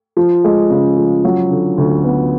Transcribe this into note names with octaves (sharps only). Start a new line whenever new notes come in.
F3
G#3
C#3
F3
F#3
D3
D2
B3